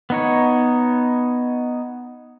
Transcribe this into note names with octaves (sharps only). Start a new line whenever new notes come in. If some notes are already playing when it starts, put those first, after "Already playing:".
B3 D#4 C#5